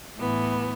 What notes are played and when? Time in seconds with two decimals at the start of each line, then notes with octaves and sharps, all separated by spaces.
0.17 A2 E3 B3